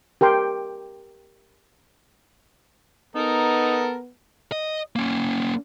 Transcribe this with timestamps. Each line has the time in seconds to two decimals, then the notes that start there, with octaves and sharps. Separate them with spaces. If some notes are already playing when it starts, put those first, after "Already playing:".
0.21 G4 A#4 G5 C6
3.16 B3 D#4 A4 A#4
4.52 D#5
4.96 A#3 C#4